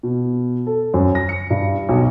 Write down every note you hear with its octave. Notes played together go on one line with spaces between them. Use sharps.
B2
A4
F#2
A#6
C#7
G2
B1